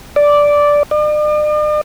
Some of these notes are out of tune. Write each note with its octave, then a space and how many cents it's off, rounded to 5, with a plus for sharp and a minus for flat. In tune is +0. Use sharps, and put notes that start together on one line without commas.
D5 -5
D5 +45